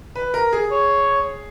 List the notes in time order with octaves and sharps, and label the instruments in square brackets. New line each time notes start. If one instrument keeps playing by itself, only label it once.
[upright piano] B4
A#4
G#4
[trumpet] C#5